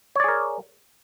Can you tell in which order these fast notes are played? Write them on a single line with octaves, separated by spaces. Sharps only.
C#5 D5 G#4 A#4